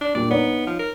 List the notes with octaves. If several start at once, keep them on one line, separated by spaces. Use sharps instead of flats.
D4
A#2 G3 D4 D5
B3 D#4 C#5
F3
A#4